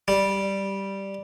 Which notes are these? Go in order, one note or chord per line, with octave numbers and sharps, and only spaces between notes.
G3